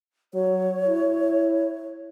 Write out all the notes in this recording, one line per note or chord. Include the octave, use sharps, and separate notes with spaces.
F#3 C#5
E4